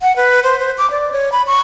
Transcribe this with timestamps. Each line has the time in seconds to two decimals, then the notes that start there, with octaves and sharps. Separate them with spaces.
0.01 F#5
0.16 B4
0.44 C5
0.59 C5
0.78 D6
0.91 D5
1.12 C#5
1.32 B5
1.47 C#6